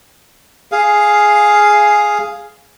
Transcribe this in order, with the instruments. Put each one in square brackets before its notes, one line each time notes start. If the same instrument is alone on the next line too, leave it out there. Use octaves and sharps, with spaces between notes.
[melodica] G#4 F5